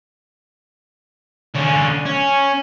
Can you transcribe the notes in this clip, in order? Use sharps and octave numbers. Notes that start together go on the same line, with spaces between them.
D3 C#4
C#4